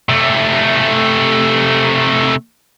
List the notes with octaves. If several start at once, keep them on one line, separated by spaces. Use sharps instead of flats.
C3 A3